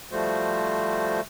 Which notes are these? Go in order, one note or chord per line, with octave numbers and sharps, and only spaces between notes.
F3 G3 A3 F#4 C5